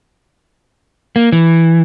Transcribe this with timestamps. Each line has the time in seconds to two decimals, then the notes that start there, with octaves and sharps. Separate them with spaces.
1.16 A#3
1.32 E3